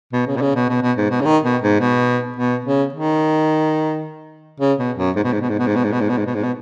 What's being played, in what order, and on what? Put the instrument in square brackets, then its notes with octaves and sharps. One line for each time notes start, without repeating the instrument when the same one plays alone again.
[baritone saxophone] B2
C#3
B2
C#3
B2
B2
B2
G#2
B2
C#3
D#3
B2
G#2
B2
B2
C#3
D#3
C#3
B2
F#2
G#2
B2
G#2
B2
G#2
B2
G#2
B2
G#2
B2
G#2
B2
G#2
B2
G#2
B2